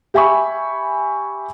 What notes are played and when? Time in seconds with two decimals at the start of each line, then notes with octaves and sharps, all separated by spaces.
0.14 G4 E5 G#5 B5 C#6